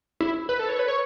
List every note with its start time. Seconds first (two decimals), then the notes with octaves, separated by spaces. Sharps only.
0.21 E4
0.49 B4
0.59 A4
0.69 C#5
0.79 B4
0.88 C#5